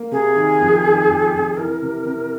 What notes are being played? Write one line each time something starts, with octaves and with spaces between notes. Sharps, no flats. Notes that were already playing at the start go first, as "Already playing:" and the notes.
Already playing: A#3
C3 G#4
D#3
F2
D#3
F2
F2
E3 A#4
C3
C3